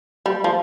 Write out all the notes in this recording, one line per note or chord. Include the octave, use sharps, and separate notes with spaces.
G3
F3